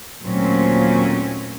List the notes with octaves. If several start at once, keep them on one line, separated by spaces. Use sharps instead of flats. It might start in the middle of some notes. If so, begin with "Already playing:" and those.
D#2 A#2 F#3 A3 C4 C#4